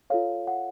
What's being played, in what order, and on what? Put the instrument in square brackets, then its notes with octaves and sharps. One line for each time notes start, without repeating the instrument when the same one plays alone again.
[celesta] F4 A4 C#5 F5
F#5